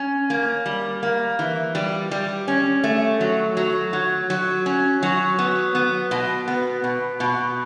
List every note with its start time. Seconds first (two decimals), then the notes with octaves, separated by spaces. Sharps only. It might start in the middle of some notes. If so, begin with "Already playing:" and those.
Already playing: C#4
0.30 A#3
0.66 G3
1.03 A#3
1.39 E3
1.75 G3
2.11 G3
2.48 C#4
2.84 A3
3.21 F#3
3.57 F#3
3.93 F#3
4.30 F#3
4.66 C#4
5.03 F#3
5.39 B3
5.75 B3
6.11 B2
6.48 B3
6.84 B2
7.20 B2